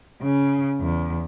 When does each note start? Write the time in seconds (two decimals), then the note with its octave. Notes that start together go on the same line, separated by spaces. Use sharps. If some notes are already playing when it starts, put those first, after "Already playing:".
0.21 C#3
0.80 E2